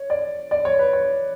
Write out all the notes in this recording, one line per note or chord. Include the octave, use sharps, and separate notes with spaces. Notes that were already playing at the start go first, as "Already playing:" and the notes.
Already playing: C#5
D5
D5
C#5
B4
C#5